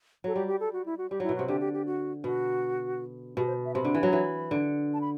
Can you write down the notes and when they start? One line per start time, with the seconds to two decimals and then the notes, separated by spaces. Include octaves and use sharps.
0.24 F#3 A4
0.35 G3 G4
0.47 G4
0.60 A4
0.73 F#4
0.86 E4
0.98 F#4
1.10 G3 G4
1.20 F#3 E4
1.29 B2
1.36 C3 F#4
1.48 D3 G4
1.60 G4
1.73 G4
1.86 F#4
2.24 B2 F#4
3.37 B2 G4
3.47 C5
3.66 E5
3.75 C3 B5
3.85 D3
3.94 E3
4.03 F#3
4.13 E3
4.51 D3
4.94 A5
5.01 B5